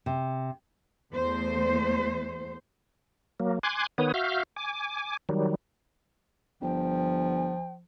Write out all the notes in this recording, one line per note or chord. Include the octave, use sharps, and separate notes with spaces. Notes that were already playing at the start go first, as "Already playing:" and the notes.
C3
E2 A3 C5
F#3 A#3
G#5 C6 D6 F#6 G#6
D#3 B3 B4 C#5 D#6
F#4 E5 F5 F6 G6
G#5 D6
D#3 F#3 G3
G1 F3 G5